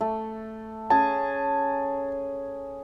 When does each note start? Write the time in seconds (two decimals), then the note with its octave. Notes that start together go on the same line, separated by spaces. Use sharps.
0.01 A3
0.90 C#4 G#4 G#5 A5